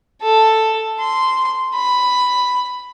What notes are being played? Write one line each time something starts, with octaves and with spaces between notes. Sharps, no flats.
A4
C6
B5